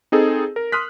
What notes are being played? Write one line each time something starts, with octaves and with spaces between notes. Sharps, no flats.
C4 D#4 G#4 A4
A#4
C6 D#6 F6 F#6 B6